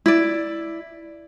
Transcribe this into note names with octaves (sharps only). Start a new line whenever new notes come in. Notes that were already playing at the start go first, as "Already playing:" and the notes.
E4 D5